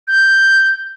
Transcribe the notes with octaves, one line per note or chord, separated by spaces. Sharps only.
G6